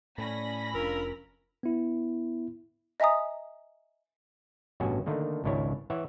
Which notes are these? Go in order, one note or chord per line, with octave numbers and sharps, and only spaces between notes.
A2 C#4 D5 B5 A#6
F1 D4 F4 A#4 E6
B3 E4
D#5 E5 G#5 A#5 D#6
A1 G2 B2 C#4 F#4 G#5
D3 D#3 A3 A#3
G#1 C#2 D4 E4 C#5
E3 C#5 E5 F#5